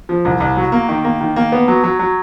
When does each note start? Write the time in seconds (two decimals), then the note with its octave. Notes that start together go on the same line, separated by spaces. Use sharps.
0.09 F3
0.25 C2
0.40 C2
0.57 F#3
0.72 A#3
0.89 D#3
1.05 A#3
1.21 D#3
1.36 A#3
1.52 B3
1.68 F#3
1.84 F#3
1.99 F#3